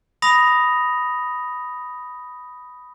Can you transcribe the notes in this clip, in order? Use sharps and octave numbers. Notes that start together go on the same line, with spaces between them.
B5 D#6 A#6 F7